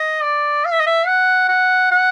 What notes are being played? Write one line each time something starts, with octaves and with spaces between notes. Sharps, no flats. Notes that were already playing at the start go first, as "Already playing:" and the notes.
Already playing: D#5
D5
F5
E5
D#5
E5
F#5
F#5
F#5